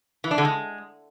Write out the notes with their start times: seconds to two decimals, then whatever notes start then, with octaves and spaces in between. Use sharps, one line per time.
0.24 E3
0.31 D4
0.38 D3
0.45 G#3